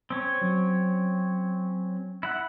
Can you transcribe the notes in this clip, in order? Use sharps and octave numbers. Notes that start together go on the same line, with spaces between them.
C4 C#4 C#5
F#3
E4 F#5